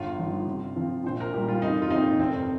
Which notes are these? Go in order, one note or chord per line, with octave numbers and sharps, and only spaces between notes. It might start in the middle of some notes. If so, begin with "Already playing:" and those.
Already playing: G1 F4
G2 F3 D#4
C3
F3 C4 F4
A#1 C5
A#4
A#2 G3 G4
F4
F1 D#4
F4
D#2 D#3 C4 D#4
F1 C4